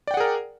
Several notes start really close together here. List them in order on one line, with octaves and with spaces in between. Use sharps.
D5 G5 F#5 G#4 A#4